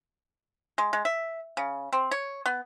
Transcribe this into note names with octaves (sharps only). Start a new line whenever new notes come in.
G#3
G#3
E5
C#3
C4
C#5
B3